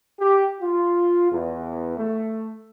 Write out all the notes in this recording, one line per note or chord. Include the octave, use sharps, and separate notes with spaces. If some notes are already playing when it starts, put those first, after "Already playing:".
G4
F4
E2
A3